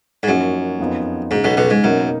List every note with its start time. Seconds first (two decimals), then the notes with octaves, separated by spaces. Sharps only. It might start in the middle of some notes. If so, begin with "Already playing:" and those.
0.23 G#2
0.27 F#2 F3 A#3 D#4 F#4
0.79 F2 F3 B3 D#4
1.31 G#2 C#3 G#3 D#4
1.44 B1 B2
1.57 B1 B2
1.70 G#2
1.83 F#2 B2 A#3 D#4 A#4